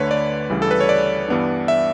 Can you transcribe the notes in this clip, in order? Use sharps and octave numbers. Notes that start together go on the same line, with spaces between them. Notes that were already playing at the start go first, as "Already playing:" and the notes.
Already playing: D2 D3 A3 B4 C#5
D5
D2 C#3 E3 G3
A4
B4
C#5
D5
G2 E3 G3 B3 D4
E5